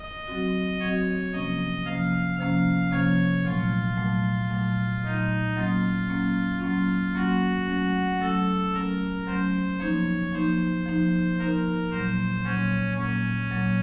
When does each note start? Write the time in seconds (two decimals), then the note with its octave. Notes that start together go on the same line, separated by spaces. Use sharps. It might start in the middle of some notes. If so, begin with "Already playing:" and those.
Already playing: D#5
0.28 F#3 C4 F#4
0.80 F#3 C4 F#4 C#5
1.33 C3 F3 A#3 C#4 D#5
1.85 C3 F3 A#3 C#4 F5
2.38 C3 F3 A#3 C#4 F5
2.91 C3 F3 A#3 C#4 C#5
3.44 A#2 F#3 A3 F4
3.97 A#2 F#3 A3
4.51 A#2 F#3 A3
5.03 A#2 F#3 A3 D#4
5.57 F#3 A#3 C#4 F4
6.09 F#3 A#3 C#4
6.62 F#3 A#3 C#4 F4
7.15 F#3 A#3 C#4 F#4
7.67 F#3 A3 C#4
8.21 F#3 A3 C#4 A4
8.74 F#3 A3 C#4 A#4
9.27 F#3 A3 C#4 C5
9.79 F3 A#3 D#4 C#5
10.33 F3 A#3 D#4 C5
10.86 F3 A#3 D#4
11.39 F3 A#3 D#4 A#4
11.91 A#2 F#3 A#3 C5
12.44 A#2 F#3 A#3 C#4
12.97 A#2 F#3 A#3 C#4
13.50 A#2 F#3 A#3